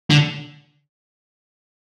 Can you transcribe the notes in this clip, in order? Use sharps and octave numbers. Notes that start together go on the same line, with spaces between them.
D3